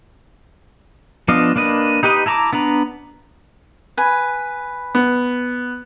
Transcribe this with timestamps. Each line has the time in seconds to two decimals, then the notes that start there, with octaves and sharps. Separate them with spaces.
1.28 F3 B3 D4 D#5 F5
1.56 A#3 D4 B4 D#5
2.03 D#4 G4 B4 D#5
2.26 E4 A5 A#5 C#6 D6
2.53 B3 D4 B4 A#5
3.97 B4 G#5
4.95 B3